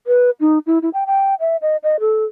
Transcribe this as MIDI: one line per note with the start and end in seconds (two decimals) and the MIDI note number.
0.07 0.30 71
0.40 0.59 63
0.67 0.79 64
0.82 0.89 64
0.94 1.04 79
1.06 1.35 79
1.40 1.57 76
1.62 1.76 75
1.83 2.00 75
2.00 2.25 69